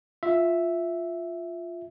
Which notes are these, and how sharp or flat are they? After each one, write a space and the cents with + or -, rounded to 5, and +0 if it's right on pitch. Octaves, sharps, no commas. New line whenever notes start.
F4 +0 E5 +0